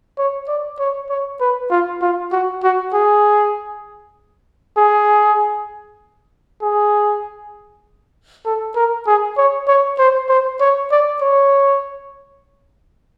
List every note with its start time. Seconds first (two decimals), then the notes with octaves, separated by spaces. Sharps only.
0.18 C#5
0.48 D5
0.79 C#5
1.10 C#5
1.40 B4
1.70 F4
2.01 F4
2.32 F#4
2.63 F#4
2.93 G#4
4.77 G#4
6.62 G#4
8.45 A4
8.76 A#4
9.07 G#4
9.37 C#5
9.67 C#5
9.98 C5
10.29 C5
10.60 C#5
10.91 D5
11.21 C#5